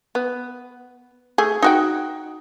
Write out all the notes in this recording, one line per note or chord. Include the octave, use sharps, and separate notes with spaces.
B3
A3 G#4
D#4 F#4 G5